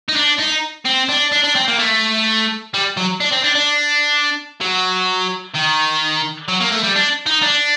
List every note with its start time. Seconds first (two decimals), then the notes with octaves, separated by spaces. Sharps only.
0.09 D#4
0.16 D4
0.39 D#4
0.85 C4
1.09 D4
1.32 D4
1.44 D4
1.55 C4
1.68 A#3
1.79 A3
2.74 G3
2.97 F#3
3.20 D4
3.32 C4
3.44 D4
3.55 D4
4.61 F#3
5.55 D#3
6.48 F#3
6.60 A#3
6.72 A3
6.83 G3
6.96 D4
7.26 D#4
7.42 D4